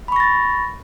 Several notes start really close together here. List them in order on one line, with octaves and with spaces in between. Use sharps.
B5 C#6 A#6 A6